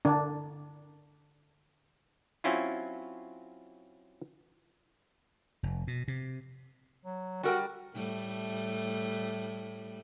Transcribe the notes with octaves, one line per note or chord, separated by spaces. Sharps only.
D3 D4
F#3 C4 C#4 E4 F4
F1
B2
C3
F#3
G3 F#4 A#4 G5
A2 G3 A3